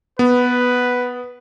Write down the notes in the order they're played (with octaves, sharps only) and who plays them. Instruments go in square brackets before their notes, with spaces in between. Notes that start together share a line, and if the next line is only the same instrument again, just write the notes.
[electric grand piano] B3 [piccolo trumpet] B4